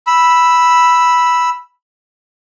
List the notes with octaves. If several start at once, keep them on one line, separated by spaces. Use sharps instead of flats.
B5 E6